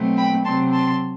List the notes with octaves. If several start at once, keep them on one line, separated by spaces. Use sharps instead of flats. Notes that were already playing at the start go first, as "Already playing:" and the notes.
Already playing: B2 F#3 A3 C4
G5 B5
C3 F#3 C4 A5 C6
A5 C6